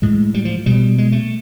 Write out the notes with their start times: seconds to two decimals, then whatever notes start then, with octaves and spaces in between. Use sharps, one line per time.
0.02 A2 G#3
0.34 G3
0.45 F3
0.66 B2 G3
0.98 G#3
1.12 A3